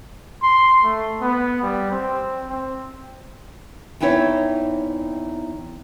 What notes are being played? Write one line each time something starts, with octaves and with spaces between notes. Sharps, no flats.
C6
A3
B3
G3
C4
C4
E2 C4 D#4 E4 C#5